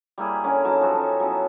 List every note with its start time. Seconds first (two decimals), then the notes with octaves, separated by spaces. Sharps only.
0.18 G3 A#3 E4 G#4
0.44 D3 C#4 A#4
0.64 E3 F#3 D#4 A5
0.81 F3 F#4 G4 A4
0.94 C#4
1.20 F#3 B3 C#4 E4